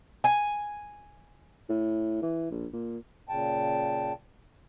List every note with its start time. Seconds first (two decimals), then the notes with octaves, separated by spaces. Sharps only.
0.24 G#5
1.69 A2
2.22 E3
2.51 A#1
2.73 A#2
3.29 A#2 C#3 G5 A5